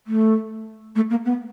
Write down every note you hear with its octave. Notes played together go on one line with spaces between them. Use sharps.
A3
A3
A#3
B3